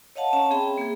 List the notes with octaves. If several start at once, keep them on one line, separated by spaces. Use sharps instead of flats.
C#5 D#5 F5 F#5 A5
C#4 C#5 E5 F5 A5 A#5
C4 G#4 E5 G5 B5
A#3 G#4